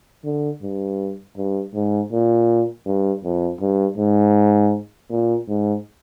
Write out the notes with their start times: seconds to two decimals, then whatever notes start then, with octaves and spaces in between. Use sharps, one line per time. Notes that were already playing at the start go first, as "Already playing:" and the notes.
0.24 D3
0.63 G2
1.37 G2
1.75 G#2
2.12 A#2
2.87 G2
3.24 F2
3.61 G2
3.98 G#2
5.10 A#2
5.48 G#2